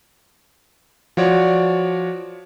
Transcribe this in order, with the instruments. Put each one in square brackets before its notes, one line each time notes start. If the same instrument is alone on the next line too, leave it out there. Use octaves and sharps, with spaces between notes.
[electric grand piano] F3 F#4 C#5 D5